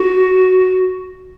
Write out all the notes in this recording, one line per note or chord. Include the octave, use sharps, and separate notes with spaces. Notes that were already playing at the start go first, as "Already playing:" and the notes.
Already playing: F#4